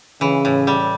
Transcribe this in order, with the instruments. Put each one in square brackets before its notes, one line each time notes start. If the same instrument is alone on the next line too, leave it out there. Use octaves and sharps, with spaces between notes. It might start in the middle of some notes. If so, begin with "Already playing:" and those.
[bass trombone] C#3 [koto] E3
[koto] A2
G3